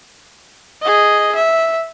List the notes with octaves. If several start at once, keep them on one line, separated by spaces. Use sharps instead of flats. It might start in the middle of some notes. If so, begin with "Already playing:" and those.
G#4 D#5
E5